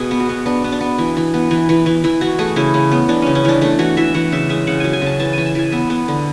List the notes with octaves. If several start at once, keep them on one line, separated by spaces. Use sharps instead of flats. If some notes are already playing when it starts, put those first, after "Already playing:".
Already playing: B2 G#4
B3
F#4
B3
B3 D4
B3
D4
B3
E3
E3
B3
E3
E3
E3
E3 E4
E3 F#4
A3 G#4
C#3 E4
C#3
B3
E3 D4
C#3 C#4
C#4
E3 D4
A3 D4
E3 F#4
E3 E5
E3 F#5
C#3 E5
G#3 E5
C#3 F#5
F#3 G#5
G#5
C#3 A5
E3 A5
E3 G#5
A5
E3 G#5
B3 E5
B3
D3